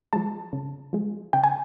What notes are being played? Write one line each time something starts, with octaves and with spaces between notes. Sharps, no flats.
F3 G#3 A5
C#3
F3 G#3
C#3 G5
G#5